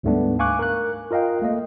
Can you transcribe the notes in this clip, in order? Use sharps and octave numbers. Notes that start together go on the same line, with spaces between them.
D2 G#2 G3 A3 B3 D4
F5 G#5 C#6 D6 F#6
A#4 F#6
F4 A#4 D#5 F5 G5
A3 A#3 D#5